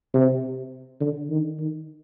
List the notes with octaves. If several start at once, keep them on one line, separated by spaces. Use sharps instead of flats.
C3
D3
D#3
D#3